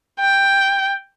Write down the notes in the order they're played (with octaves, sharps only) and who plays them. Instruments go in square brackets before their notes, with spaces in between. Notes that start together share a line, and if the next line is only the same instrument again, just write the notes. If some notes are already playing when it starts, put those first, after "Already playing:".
[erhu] G5